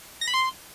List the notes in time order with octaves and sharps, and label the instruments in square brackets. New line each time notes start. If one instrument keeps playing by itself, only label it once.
[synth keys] A#6
B5
C6